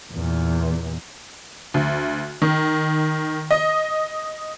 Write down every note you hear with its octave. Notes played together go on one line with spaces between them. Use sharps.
E2 A#2
D2
D#3
D#5